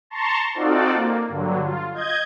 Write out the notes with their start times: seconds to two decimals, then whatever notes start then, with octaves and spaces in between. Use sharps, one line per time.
0.10 A5 A#5 C6 C#6
0.54 C4 D#4 F4 F#4 A4 D5
0.94 A#3
1.28 G2 D3 F#3
1.63 F4
1.94 D#5 G6 G#6